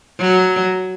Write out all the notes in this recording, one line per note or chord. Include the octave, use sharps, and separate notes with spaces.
F#3